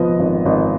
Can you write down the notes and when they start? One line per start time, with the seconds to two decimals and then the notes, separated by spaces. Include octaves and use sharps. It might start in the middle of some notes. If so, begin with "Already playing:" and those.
Already playing: G#1 F3 B3 D#5
0.20 G#1
0.45 G#1 D#5